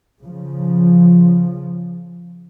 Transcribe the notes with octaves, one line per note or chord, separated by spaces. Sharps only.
C#3 F3